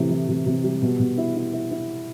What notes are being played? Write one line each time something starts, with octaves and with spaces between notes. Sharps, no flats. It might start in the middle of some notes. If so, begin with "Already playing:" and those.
Already playing: A2 C3 E3
E3
C3
C3
G3
B2
B2
E4
E4
E4
E4